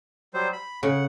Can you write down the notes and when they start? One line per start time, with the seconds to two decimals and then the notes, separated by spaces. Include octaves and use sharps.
0.34 F#3 G3 C5
0.53 B5
0.83 C#3 F#5